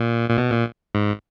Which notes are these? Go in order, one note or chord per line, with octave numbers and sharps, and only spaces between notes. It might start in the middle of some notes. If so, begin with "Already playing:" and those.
Already playing: A#2
A#2
B2
A#2
G#2